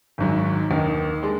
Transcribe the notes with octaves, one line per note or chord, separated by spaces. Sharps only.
G#1 G#2 F#3
D#2 D#3 A#3 D#4
D3 G#3 D4